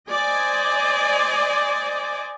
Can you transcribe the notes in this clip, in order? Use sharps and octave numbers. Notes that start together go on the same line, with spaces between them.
C5 D5 D#5 G#5